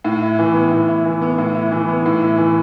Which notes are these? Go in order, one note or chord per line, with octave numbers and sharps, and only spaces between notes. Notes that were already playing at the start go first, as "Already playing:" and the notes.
A2
E4
E3
B3
A2
E4
E3
B3
A2
E4
E3
B3
A2
E4
E3